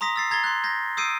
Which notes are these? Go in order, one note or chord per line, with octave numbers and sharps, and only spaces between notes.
A#5 C6 D#6 A#6 B6
E6 A6 C7
A#5 G#6 A6 C7 G7
C6 F#6
G6 G#6 A#6
D#6 E6 G6 C7 D7 D#7